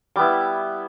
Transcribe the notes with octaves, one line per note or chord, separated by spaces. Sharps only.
G3 B3 E4 D6